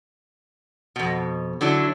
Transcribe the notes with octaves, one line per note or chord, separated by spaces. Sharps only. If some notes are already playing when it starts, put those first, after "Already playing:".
F2 B2
D3 F#3 D4 E4